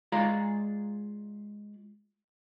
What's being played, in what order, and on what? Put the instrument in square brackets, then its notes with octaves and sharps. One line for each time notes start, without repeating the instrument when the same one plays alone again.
[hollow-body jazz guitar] G#3 F4 G#4 D5 F5 A#5